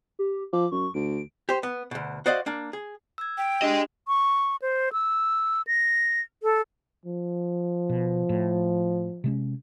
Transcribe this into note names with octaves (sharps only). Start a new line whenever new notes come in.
G4
F3 D6
F#2 C#6
D2 D7
G4 C5
B3
D2 B2
F#4 C5 D5 D#5 F5 F#5
A#3 D4
G#4
E6 G#6
G5
D4 G4 G#4 D#5
C#6
C5
E6
A#6
A4
F3
B2
A2
C3 G#3 C#4